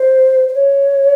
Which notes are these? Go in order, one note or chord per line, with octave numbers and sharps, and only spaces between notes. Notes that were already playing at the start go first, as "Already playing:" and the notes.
Already playing: C5
C5
C#5